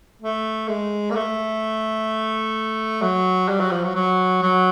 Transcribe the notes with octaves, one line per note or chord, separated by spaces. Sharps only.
A3
G#3
A#3
A3
F#3
G3
F#3
F3
F#3
F#3
F#3